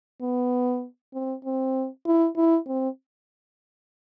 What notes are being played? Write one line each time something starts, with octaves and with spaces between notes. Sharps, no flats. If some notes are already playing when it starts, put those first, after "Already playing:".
B3
C4
C4
E4
E4
C4